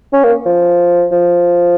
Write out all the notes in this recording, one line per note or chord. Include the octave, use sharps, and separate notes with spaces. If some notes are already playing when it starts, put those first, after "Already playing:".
C#4
A#3
F3
F3